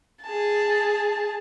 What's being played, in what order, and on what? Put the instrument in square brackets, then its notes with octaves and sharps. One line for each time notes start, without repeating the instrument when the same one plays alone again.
[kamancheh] G#4 A5